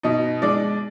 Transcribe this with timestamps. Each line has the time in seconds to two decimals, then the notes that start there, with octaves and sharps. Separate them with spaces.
0.03 B2 D#4 D#5
0.42 G#3 D4 D5